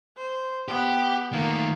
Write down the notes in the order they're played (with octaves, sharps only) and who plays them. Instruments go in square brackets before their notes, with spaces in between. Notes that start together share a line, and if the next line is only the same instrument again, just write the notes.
[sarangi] C5
[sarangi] B3 [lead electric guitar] G4
[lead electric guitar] D#3 A3 [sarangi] A#3